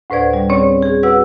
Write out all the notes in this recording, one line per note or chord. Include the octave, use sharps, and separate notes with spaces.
D2 A2 B4 C5 D5 G#6
G3
C4 C#4 G#4 C#5 D5
G#4
F#4 B4 F#5 E6